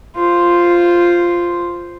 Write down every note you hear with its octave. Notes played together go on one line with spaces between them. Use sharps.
F4 C5